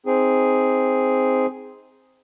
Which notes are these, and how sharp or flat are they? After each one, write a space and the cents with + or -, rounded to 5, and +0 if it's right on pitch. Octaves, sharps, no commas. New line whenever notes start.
C4 -5 D#4 +20 G#4 +0